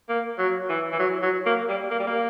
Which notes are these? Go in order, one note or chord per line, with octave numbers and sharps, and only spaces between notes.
A#3
F#3
E3
E3
F#3
F#3
A#3
G3
A#3
G3
A#3